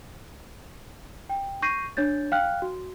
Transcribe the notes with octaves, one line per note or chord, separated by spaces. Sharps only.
G5
C#6 G6 A#6 C7 D#7
D4 C#5 G6 A6
F5 G5 F6 F#6
F#4